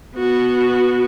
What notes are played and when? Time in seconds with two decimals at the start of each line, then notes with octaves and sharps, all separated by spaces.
0.16 B3 F#4